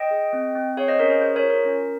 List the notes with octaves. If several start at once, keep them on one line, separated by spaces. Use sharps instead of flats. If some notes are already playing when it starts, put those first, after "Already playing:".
Already playing: D#5 G5
G#4
C4
C4
G#4 C#5 F5
C5 D#5
C#4 A#4 C#5
C5
G#4 C5
A#4 C#5
F4
A#4
C#4